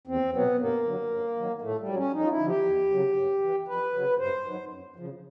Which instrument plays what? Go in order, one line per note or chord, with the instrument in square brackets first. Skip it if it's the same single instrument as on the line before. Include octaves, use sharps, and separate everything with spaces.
[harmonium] E2 C4
B2 F#3 B3
G2 A#3
D3 F#3
G2
D#3 F#3
A2 A3
G3
F#3
C#4
F2 D#4
F4
E4
D3 F3
G4
E2
C#3 F#3
G2
E3
F2 B4
C#3 F#3
G2 C5
D#3 F#3
F#2
C#3 F3